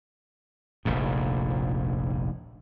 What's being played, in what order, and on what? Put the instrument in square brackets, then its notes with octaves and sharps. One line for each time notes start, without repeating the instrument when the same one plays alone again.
[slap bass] F1 A#1 D#2 G#2